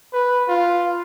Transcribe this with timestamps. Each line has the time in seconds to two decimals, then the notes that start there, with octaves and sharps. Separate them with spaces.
0.13 B4
0.48 F4